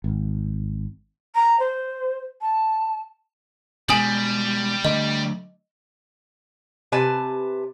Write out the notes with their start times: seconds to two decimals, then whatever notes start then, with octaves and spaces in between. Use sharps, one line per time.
0.04 G#1
1.35 A#5
1.60 C5
2.41 A5
3.89 B2 G3 G#3 G#5 D#6 F#7
4.85 D3 A3 D#5
6.92 C3 B4 G#5 A5